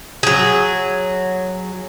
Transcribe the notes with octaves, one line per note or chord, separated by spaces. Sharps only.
F#3 G#4